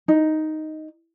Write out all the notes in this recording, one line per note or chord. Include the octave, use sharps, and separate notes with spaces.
D#4